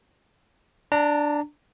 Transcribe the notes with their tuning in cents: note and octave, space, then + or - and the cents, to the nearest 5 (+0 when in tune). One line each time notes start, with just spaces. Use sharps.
D4 +0 A#5 -35